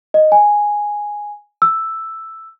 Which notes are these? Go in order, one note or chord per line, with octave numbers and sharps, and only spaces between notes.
D#5
G#5
E6